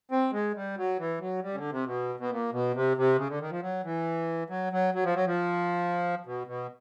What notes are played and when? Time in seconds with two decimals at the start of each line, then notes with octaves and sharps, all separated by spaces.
0.11 C4
0.33 G#3
0.56 G3
0.78 F#3
0.99 E3
1.20 F#3
1.43 G3
1.54 C#3
1.57 D3
1.72 C3
1.86 B2
2.19 B2
2.31 A#2
2.53 B2
2.75 C3
2.97 C3
3.18 C#3
3.29 D3
3.41 D#3
3.51 F3
3.62 F#3
3.84 E3
4.50 F#3
4.73 F#3
4.94 F#3
5.05 F3
5.15 F#3
5.26 F3
6.26 B2
6.47 B2